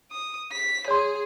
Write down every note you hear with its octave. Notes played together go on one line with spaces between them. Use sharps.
D#6
B6
G#4 C#5 C6